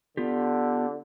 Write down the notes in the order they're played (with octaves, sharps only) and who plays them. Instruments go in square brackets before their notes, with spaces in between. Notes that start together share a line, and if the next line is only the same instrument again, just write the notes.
[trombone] D3 [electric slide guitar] B3 F4 G4